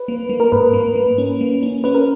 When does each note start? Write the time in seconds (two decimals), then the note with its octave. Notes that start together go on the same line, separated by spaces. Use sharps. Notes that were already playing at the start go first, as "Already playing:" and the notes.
Already playing: B4
0.08 A#3
0.29 A#3
0.40 A#4
0.52 G#2 B4
0.73 A#3
0.95 A#3
1.18 C#4
1.41 A#3
1.63 C#4
1.84 C#4 B4
1.95 A#4